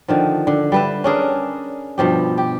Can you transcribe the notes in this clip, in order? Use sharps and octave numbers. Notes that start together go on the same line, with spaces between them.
D3 D#3 F3
D3
G3 B4 E5
C#4 D4 G#4 A#4
G2 B2 F3 G4
G4